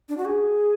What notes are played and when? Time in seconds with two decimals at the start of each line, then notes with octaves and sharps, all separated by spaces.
0.09 D4
0.17 F#4
0.25 G#4